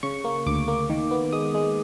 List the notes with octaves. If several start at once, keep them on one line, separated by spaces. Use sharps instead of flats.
C#3 C#6
A#3
D2 D6
A#3
D#3
B3
G#3 D#6
G#3